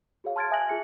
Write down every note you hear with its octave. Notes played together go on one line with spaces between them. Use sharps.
F#4 G#4 C#5 F5
A5 C6 F6 G#6 A6 D7
E5 G#5 D#6 F#6 A#6 F#7
F4 G#4 C#7